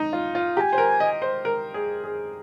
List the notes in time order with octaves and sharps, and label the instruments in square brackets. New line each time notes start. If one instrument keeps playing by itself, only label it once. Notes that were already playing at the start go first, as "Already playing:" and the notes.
Already playing: [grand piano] D#4
F4
F4
[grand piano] G4 [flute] G#5 A#5
[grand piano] C5
A#4
D#5
C5
A#4
G#4
G#4